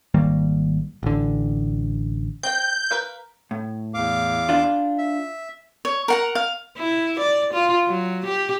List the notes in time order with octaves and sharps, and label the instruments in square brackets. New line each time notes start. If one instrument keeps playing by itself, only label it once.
[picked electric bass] G#1 D#3 G3 A#3
A1 D3
[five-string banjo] C4 G5 [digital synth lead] G6
[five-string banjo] A#4 B4 F5
[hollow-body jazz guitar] A2
[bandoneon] E2 F5 D6
[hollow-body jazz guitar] D4 F4
[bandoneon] E5
[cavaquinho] C#5
A#4 F#5 A#5
F5
[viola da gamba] E4
D5
F4
F#3
G4